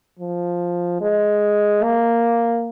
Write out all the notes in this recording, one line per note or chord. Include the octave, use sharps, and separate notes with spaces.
F3
G#3
A#3